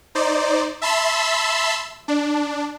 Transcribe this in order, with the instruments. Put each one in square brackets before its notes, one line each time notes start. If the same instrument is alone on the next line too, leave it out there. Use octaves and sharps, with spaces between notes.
[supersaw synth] D#4 C5 D5
E5 A5 B5 C6 E6
D4